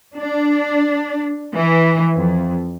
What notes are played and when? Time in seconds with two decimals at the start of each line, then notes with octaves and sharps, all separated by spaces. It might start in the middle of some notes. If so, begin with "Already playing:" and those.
0.16 D4
1.53 E3
2.15 F2